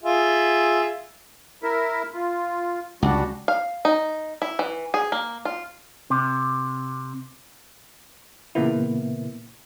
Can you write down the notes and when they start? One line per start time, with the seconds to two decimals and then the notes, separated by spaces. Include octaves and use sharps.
0.03 F4 G#4 E5
1.63 E4 A#4 E5
2.14 F4
3.02 C#2 G3 D4 F#4
3.48 F5
3.85 D#4
4.42 E4
4.59 E3
4.94 G#4
5.12 A#3
5.45 F4
6.10 C3
8.55 A#2 C#3 E3 A#3 B3 E4